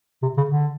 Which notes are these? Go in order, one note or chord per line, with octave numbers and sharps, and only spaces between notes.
C3
C#3
D3